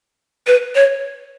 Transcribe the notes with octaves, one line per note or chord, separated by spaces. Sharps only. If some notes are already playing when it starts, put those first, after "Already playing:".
B4
C#5